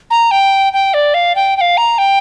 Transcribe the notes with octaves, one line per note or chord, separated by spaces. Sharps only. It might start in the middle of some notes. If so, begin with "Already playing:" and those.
A#5
G5
G5
D5
F5
G5
G5
F5
A#5
G5